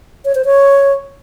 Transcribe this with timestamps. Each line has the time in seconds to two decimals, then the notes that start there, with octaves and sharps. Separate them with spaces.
0.25 C#5
0.35 C5
0.45 C#5